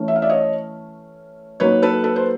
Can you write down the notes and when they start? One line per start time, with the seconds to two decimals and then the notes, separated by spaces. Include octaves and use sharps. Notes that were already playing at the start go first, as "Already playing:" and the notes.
Already playing: E3 A3 C#4
0.08 E5
0.16 F5
0.22 D5 E5
0.30 C#5 D#5
1.60 F#3 A#3 D#4 B4 C#5
1.82 A4 B4
2.04 A4 B4
2.16 C5